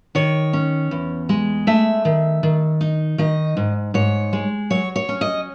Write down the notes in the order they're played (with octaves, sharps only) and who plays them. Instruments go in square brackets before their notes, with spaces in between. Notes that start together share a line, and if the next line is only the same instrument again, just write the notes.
[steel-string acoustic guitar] D#3 C#5
C#4
E2
G#3
A3 E5
D#3
D#3
D#4
D#3 D#5
G#2
G#2 C#5
G#3
F#3 C#5
C#5
C#4
D#5